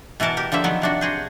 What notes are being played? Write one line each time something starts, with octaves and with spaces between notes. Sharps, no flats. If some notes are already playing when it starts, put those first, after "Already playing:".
B2 E3 F#4 A#4 A5
G4 A#4
D3 F3 A#3 E5
D#3 F3 F#3 B3
C3 D4 F#4
F#4 G#4 C5